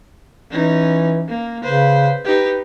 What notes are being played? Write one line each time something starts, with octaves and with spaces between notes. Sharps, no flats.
E3 C#4 D#4
A#3
C#3 B4 C5
D#4 G4 B4